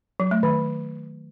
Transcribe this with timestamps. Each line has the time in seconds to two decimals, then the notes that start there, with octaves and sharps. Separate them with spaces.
0.20 F#3
0.31 A3
0.43 D#3